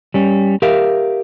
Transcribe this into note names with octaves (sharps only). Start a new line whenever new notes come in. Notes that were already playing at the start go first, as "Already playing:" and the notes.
G3 C#4
G4 A#4 E5 F5